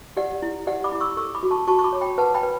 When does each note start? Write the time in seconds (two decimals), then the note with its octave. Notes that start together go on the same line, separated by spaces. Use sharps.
0.17 G4 D5 F#5
0.42 E4
0.67 G4 D5 F#5
0.84 B5 D6
0.92 E4
1.00 C#6 E6
1.17 A4 C#6 E6
1.35 B5 D6
1.43 F#4
1.51 A5 C#6
1.67 F#4 A5 C#6
1.79 C#6
1.84 B5 D6
1.93 C#5
2.01 G5 B5
2.18 B4 F#5 A5
2.35 G5 B5
2.43 B4